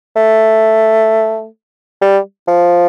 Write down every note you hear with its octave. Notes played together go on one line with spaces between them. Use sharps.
A3
G3
F3